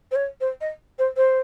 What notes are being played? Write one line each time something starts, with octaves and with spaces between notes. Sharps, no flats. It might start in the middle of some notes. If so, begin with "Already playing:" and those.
C5
C#5
C5
D#5
C5
C5